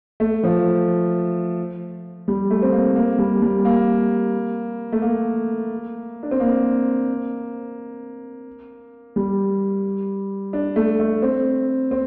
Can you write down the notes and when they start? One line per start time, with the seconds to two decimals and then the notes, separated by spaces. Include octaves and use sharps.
0.20 A3
0.43 F3
2.28 G3
2.50 A3
2.62 C4
2.73 A#3
2.96 A#3
3.18 G3
3.42 G3
3.65 A#3
4.92 A3
5.02 A#3
6.23 D4
6.31 C4
6.40 A#3
9.16 G3
10.53 D4
10.76 A3
11.00 A3
11.22 C4
11.91 C4